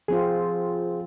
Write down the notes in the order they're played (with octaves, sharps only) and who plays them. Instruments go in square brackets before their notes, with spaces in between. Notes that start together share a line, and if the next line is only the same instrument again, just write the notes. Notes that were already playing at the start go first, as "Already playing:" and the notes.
[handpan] F3 C4 F4 [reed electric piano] G#4